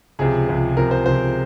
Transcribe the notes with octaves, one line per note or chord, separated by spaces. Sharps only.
C#2 C3 F3 G#4
C#2 C3 F3
C#2 C3 F3 A#4
C5
C#2 C3 F3 C5